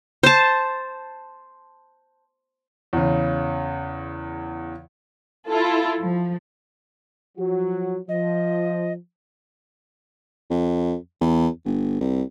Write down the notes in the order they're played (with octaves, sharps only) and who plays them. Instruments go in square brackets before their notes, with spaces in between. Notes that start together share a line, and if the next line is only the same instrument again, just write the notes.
[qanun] C5 A5
[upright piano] E2 C#3
[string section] E4 F4 A4
F3
[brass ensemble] F3 F#3 F#4
[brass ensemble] F3 [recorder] D#5
[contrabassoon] F2
E2
G1
C2